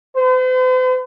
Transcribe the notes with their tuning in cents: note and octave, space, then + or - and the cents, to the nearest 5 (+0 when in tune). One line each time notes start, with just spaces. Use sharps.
C5 -45